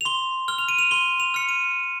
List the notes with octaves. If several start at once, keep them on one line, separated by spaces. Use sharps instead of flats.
F7
C6 G7
F6 G7
F7
D#7
F7
C6 G7
F7
F6 C#7
D#7